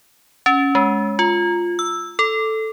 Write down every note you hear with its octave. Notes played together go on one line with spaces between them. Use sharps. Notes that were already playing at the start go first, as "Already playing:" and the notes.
C#4
G#3
F4
E6
A4